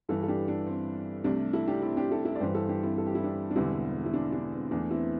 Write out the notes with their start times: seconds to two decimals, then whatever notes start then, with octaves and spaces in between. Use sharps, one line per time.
0.09 G1 G2 E3 E4 A4
0.23 A4
0.28 D4 G4
0.48 D4
0.67 C4
1.24 C2 C3 A3 D4
1.53 E4 A4
1.68 D4 G4
1.82 C4 E4
1.97 D4 G4
2.11 E4 A4
2.25 E4 A4
2.35 D5
2.40 G1 G2 E3 G4 C5
2.54 E4 A4
2.69 D4 G4
2.83 C4 E4
2.98 A4
3.07 G4
3.15 E4
3.24 D4 G4
3.51 D4
3.56 E1 E2 D3 G3 C4 E4
4.06 E4
4.14 D4
4.32 D4
4.52 C4
4.71 E2 E3 A3 D4
4.91 C4 E4